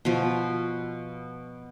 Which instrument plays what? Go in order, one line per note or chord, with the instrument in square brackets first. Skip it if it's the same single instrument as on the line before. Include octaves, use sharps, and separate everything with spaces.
[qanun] B2 F3